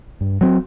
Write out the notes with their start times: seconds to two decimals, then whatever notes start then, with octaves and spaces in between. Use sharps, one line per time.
0.21 G2
0.41 F#3 C4